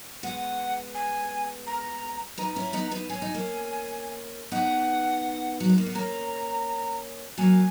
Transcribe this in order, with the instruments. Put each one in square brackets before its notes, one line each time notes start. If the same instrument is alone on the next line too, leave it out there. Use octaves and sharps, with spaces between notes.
[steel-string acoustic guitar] G#3 B3 [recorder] F#5
[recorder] G#5
A#5
[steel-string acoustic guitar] B3 D#4 [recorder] A#5
[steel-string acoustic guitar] C#4 E4
B3 D#4
B3 D#4
[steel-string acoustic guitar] C#4 [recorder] G#5
[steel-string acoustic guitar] D#4
A#3 C#4
[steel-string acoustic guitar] B3 D#4 [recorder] F#5
[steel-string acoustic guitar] F#3
G#3
A#3
B3
[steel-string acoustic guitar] A#3 C#4 [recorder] A#5
[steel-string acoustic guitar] F#3 A#3 [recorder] G#5